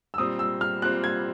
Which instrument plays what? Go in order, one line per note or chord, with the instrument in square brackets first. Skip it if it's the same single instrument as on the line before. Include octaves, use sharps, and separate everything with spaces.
[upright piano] E6
[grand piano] A#2 G3 C4 [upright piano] D#6
[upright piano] E6
F6
[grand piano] A#2 G3 C4 [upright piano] F#6
[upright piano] G#6